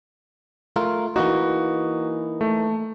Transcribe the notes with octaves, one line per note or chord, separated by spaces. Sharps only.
A3 F4 A#4
E3 A#3 D#4 F#4
A3